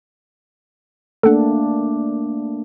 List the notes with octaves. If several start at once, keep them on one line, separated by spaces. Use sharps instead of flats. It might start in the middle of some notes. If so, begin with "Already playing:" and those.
A3 A#3 D4 A4 F#5